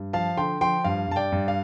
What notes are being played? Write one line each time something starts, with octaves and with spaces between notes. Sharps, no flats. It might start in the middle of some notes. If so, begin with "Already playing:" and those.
Already playing: G2
F3 F5 A5
D3 G5 C6
F3 G5 C6
G2 F5
G2 A5
D5 G5
G2
F5